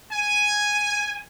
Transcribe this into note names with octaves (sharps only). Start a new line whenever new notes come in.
G#5